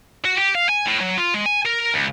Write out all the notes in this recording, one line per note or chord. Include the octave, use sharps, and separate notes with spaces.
F#4
G4
F5
G#5
A2
F#3
F4
G#3
G#5
A#4
C#2